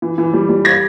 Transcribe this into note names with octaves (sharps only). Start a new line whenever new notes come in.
E3
E3
G3
G3
G#6 A#6